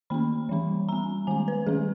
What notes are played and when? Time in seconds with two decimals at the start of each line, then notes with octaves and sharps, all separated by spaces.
0.10 D#3 A#3 C#4 B5
0.49 E3 G3 C#4
0.89 G3 B3 A#5
1.27 D#3 G#3 C#4 G#5
1.48 B4
1.66 D#3 G3 C#4 G#4